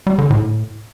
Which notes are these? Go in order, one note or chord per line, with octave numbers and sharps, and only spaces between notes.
G3
D3
A2